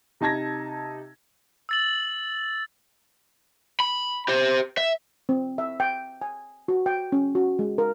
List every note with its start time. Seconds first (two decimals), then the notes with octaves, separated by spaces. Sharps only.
0.20 C3 D#4 A5 G#6 A#6
1.69 E6 A6 F#7
3.80 B5
4.28 G4 C5
4.77 E5
5.29 C4
5.58 E5
5.80 G5
6.22 G#5
6.68 F#4
6.86 G5
7.12 C#4
7.35 F#4
7.59 G#3
7.78 A#4